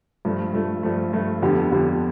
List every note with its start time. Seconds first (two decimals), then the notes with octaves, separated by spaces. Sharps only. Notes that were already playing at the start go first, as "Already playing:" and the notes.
0.25 G2 F3 A3
0.54 G2 F3 A3
0.83 G2 F3 A3
1.13 G2 F3 A3
1.42 F2 D3 G3 B3
1.72 F2 D3 G3 B3